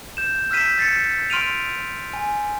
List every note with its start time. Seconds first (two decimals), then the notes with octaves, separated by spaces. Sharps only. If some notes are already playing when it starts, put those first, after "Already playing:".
0.17 G6 E7
0.51 E6 F6 G6 B6 D#7 E7
0.79 A6 C7 C#7
1.30 C6 F6 D7 D#7 F7
2.13 G#5